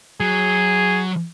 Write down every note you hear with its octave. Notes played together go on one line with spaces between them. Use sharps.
F#3 G#4